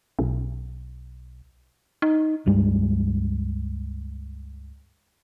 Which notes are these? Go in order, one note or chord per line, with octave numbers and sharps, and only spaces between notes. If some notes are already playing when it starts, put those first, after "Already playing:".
B1
D#4
C#2 G2 G3 G#3